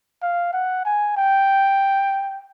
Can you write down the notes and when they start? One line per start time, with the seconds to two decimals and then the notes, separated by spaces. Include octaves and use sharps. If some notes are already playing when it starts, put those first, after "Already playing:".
0.22 F5
0.53 F#5
0.85 G#5
1.17 G5